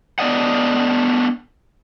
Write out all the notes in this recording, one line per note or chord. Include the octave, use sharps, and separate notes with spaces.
A3 B3 D4 D5 D#5 F#5